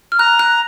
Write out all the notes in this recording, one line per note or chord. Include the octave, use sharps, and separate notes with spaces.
F6
A#5 F#6
F#6